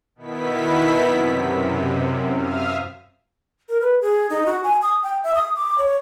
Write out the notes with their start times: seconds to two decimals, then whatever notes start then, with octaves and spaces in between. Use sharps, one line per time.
0.15 B2 D#3 B3 E4 B6
1.05 F#2 C3
2.34 E5 F5 D#6 F6
3.69 A#4
3.81 B4
4.01 G#4
4.30 D#4
4.46 F#4
4.63 G#5
4.82 D#6
5.03 G5
5.24 E5
5.35 D#6
5.56 D6
5.78 C#5